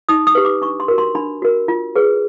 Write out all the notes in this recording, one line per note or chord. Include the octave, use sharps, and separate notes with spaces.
D#4 D#6
D#6
G4 B4
D6
D4 C#6
C6
F#4 A#4
C6
D4 B5
F#4 A#4
F4
G#4 B4